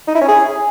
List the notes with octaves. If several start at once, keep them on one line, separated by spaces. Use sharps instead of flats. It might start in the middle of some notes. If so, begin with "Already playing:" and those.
D#4
E4
C#4
G#4